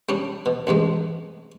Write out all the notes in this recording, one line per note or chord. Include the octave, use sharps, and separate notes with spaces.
G3 C#4 D4
B2
A1 G2 C3 G#3